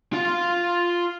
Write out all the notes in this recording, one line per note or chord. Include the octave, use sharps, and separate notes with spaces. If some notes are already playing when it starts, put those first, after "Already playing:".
F4 F5